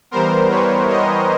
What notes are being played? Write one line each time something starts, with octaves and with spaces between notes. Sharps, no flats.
E3 G3 B3 A#4 C5
B4 C#5
C#5 D#5